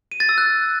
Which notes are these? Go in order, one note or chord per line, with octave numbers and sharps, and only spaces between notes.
D#7
A6
E6
F#6